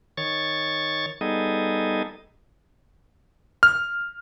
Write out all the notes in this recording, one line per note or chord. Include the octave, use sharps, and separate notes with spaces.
D#3 C#5 C#6 A6
G3 B3 D#4 G#4 A4 D#5
F6